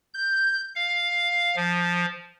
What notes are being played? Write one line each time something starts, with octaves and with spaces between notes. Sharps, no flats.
G6
F5
F3